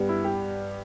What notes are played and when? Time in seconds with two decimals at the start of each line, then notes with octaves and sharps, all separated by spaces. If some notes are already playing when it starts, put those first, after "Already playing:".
Already playing: G2 G3 B3
0.09 E4
0.24 G4